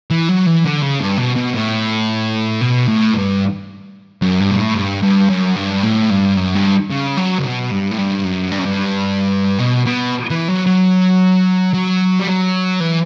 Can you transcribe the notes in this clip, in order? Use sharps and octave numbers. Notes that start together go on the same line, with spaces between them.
E3
F#3
E3
D3
C#3
G2
B2
B2
A2
B2
A2
G2
F#2
G2
B2
A2
G2
G2
F#2
G2
A2
G2
F#2
G2
C#3
F#3
C#3
B2
G2
A2
G2
F#2
G2
F#2
G2
B2
B2
E3
F#3
F#3
F#3
G3
F#3
E3